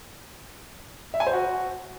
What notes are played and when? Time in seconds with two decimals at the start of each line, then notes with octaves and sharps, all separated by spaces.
1.14 E5
1.20 G#5
1.27 C5
1.33 F#4